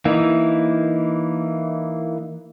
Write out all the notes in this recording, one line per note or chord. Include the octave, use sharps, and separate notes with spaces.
E3 A#3 D#4 E4